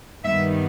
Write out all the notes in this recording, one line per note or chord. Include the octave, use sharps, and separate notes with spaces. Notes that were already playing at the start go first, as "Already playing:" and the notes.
G2 D#3 G3 B3 E5